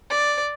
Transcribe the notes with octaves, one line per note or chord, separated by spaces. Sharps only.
D5